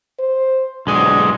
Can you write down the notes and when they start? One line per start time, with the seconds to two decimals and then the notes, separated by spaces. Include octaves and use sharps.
0.20 C5
0.87 B1 G#3 D4